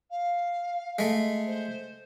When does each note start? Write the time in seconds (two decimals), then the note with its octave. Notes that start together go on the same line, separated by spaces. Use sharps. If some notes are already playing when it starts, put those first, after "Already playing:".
0.10 F5
0.99 G#3 A3
1.46 C5